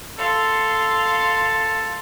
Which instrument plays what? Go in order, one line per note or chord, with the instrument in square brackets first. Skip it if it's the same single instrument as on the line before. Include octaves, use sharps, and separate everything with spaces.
[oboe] A4 [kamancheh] F5 C6